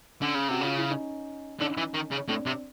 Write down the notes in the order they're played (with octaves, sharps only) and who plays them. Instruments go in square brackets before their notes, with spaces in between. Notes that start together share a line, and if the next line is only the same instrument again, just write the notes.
[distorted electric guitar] D3 [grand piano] C#4
[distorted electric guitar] C#3
[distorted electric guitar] C3 [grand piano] F#4
[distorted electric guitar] C#3 [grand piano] F4
[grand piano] E4
C#4 D#4
[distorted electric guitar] D3 [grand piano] C#4 D#4
[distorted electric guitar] E3
D#3
C#3
[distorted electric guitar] A2 [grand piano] C4 D4
[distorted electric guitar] C3